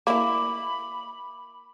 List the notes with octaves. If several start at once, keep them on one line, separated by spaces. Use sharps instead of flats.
A#3 E4 B5 D6